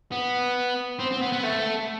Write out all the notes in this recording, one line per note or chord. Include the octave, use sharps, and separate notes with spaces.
B3
C4
C4
B3
B3
A3